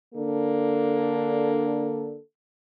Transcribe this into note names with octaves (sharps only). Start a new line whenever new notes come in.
D3 A#3 D4 A4